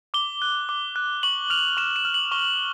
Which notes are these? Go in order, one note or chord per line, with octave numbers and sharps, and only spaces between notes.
D6 G7
F#6
D6
F#6
C#6 F#7
F6 F7
C#6 E7
E7
F6
F#7
C#6 G7